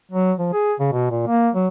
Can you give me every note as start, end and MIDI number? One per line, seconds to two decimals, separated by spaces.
0.12 0.32 54
0.39 0.51 53
0.53 0.73 68
0.79 0.89 49
0.93 1.10 47
1.11 1.23 46
1.27 1.49 58
1.55 1.68 54